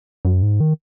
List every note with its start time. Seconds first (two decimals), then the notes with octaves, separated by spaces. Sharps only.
0.25 F#2
0.42 G#2
0.60 D#3